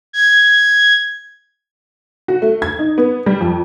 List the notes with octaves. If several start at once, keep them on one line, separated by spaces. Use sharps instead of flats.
G#6
F#4
A3
G#6
D#4
B3
G3
F2